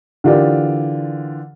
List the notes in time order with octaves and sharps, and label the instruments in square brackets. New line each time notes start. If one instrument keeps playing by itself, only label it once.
[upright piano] D3 E3 F4 G4 A#4 D5